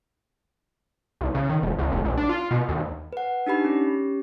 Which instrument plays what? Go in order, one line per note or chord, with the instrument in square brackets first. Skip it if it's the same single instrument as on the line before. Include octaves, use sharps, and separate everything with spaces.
[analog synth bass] C2
C#3
D#3
E1
C#2
F1
A#1
D4
F4
B2
D#2
[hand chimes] B4 F#5
D4 D#4 G4 B5
C#4 G4